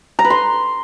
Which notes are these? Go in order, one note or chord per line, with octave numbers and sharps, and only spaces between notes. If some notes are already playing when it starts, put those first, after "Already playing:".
A#5
B4
C6